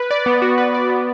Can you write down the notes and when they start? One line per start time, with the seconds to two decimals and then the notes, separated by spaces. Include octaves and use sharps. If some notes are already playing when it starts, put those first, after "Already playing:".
Already playing: B4
0.11 D5
0.26 B3
0.42 F#4
0.58 B4
0.74 D5
0.90 B3